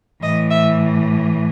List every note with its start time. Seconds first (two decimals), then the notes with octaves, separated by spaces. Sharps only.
0.22 A2 E3 D#5
0.50 E5